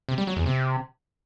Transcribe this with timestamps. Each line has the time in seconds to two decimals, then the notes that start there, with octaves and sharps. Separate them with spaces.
0.09 C3
0.18 G3
0.27 F#3
0.37 E2
0.46 C3